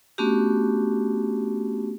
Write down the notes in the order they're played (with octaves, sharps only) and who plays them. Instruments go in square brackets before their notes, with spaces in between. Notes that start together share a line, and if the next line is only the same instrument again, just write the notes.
[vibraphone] A3 B3 C#4 D4 F#4 G4